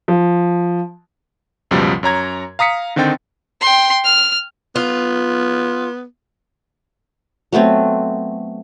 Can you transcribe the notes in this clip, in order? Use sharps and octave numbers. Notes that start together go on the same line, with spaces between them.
F3
C#2 F#2 B2 F3 G3
F#2 C#5 A#5 G#6
F5 A#5 D#6 B6 C#7
D3 D#3 C4 D#4 G5 A6
G5 C6
F6
B3 F4
F#3 A3 B3 C4